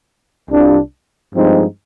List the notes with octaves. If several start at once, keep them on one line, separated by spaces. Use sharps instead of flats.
C2 C3 G3 D4 F4
G2 F3 G#3 C4 D#4